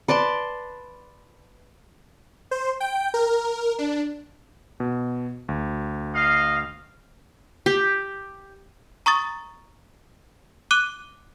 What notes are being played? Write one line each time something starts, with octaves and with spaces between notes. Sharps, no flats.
B4 D5 A5 C6
C5
G5
A#4
D4
B2
D2
D#5 F5
G4
A#5 C#6 D#6 A6
D6 F#6 D#7 G7